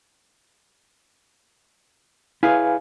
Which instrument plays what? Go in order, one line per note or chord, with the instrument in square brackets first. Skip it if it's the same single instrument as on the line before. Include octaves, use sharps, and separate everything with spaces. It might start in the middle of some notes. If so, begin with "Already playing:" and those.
[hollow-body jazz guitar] E4 G#4 C#5 [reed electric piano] B4 F5 G#5